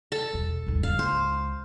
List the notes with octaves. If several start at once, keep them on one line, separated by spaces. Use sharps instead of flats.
A4 A5
E2 B2
D#2 G#2
C#2 G#3 F5
C5